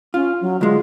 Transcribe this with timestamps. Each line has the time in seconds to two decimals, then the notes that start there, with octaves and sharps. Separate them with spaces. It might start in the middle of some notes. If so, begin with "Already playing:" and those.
0.14 C#4 F4
0.41 F#3
0.61 D2 G#3 F4